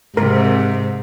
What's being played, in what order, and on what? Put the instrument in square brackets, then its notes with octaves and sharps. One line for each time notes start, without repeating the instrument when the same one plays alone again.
[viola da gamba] G#2 [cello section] C3 [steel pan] A#4